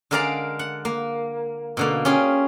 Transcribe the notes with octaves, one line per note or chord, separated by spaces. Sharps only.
D3 G#3 A#4 D5 F5 A#5
F#5
A#3
B2 D3 A#3
C#4 F4 G4 G#4 G5